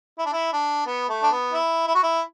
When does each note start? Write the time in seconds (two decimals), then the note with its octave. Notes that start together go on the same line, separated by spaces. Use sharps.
0.18 E4
0.26 D4
0.32 E4
0.53 D4
0.86 B3
1.09 A3
1.23 D4
1.31 B3
1.52 E4
1.87 E4
1.95 F#4
2.03 E4